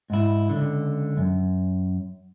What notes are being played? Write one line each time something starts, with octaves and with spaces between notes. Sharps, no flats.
G#2 E4
C#2 D3
F#2